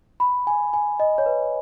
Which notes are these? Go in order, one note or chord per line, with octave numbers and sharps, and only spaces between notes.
B5
G#5
G#5
D#5
C#5
B4